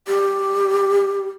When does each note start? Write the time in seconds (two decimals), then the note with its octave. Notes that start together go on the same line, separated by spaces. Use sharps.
0.08 G4